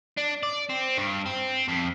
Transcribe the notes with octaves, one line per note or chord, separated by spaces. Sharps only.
D4
D5
C4
G2
C4
F2